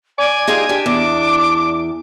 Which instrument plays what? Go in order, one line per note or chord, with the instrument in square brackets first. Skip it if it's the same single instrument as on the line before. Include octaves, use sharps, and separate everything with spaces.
[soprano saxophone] D5 [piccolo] G#5
[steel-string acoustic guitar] D#4 F4 G4 [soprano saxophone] G#4
[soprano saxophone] D4 [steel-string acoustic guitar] G4
[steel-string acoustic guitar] E2 [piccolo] D6